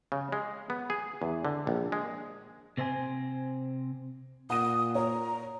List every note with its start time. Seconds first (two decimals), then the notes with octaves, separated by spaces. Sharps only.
0.12 C#3
0.32 G#3
0.70 B3
0.90 G#4
1.22 E2
1.45 D3
1.67 A#1
1.92 G#3
2.77 C3 C4 C5 D#5 G#5
4.50 A#2 F#5 D#6 D#7
4.95 C#5 A#5